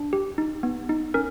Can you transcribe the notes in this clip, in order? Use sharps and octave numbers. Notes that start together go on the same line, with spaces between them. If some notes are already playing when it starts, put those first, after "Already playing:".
Already playing: D4
G4
D#4
B3
D#4
C#4 A#4